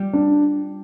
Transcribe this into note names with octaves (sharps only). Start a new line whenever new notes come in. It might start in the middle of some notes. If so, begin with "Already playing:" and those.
Already playing: G3 F4 G4
D4